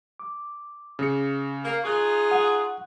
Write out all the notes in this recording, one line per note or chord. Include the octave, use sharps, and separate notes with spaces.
D6
C#3 C#7
A#3
D#4 F4 G#4 C#6 F#6
F#5